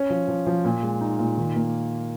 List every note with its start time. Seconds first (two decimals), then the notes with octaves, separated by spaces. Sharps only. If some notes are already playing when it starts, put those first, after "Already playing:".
Already playing: C#4
0.10 F3
0.28 F3
0.47 F3
0.65 A#2
0.83 G#3
1.01 D#4
1.19 A#2
1.37 D#3
1.56 A#3